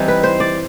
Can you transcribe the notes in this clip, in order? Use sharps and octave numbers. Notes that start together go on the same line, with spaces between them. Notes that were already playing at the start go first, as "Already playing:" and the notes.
Already playing: E3 G3 C4 D#4
B4
C5
D5